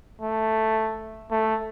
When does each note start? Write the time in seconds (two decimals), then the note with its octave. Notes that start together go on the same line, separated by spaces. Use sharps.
0.21 A3
1.31 A3